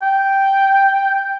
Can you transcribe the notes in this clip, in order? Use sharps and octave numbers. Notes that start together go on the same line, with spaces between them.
G5